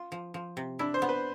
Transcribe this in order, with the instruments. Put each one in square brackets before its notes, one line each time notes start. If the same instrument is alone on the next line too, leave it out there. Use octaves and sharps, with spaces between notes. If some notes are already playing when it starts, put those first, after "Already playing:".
Already playing: [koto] F4
F3
F3
C3
[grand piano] D4 [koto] E4
[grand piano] C5
[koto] B3
[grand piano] B4